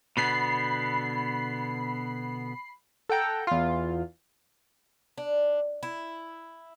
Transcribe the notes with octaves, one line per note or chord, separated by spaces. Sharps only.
B2 D3 B3 B5 C7
A4 F#5 G5 A#5
E2 F4
D4
E4